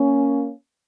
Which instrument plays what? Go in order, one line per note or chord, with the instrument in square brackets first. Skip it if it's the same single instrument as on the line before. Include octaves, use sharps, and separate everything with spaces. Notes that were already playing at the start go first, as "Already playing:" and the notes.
Already playing: [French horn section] A#3 C#4